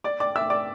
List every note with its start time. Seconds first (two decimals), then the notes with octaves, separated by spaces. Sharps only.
0.04 D5 D6
0.20 D5 D6
0.36 E5 E6
0.50 D5 D6